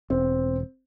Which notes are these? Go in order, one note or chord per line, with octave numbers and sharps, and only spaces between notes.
E1 C4